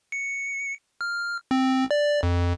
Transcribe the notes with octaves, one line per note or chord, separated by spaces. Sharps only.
C#7
F6
C4
D5
F2